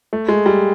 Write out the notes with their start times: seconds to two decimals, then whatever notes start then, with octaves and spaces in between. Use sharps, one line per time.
0.13 A3
0.29 G#3
0.46 G3